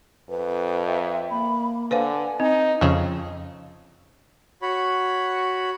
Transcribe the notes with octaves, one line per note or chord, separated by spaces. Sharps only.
F2 B4
E5
A#3 B5
D3 B4 C5 F5 G#5
C4 D#4 D#5
F2 C#3
F#4 C#5 B5